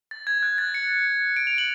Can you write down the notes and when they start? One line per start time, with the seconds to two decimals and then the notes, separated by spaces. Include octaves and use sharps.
0.11 A6
0.27 G#6
0.43 F#6
0.58 A6
0.74 C#7
1.36 D7
1.47 F7
1.58 F#7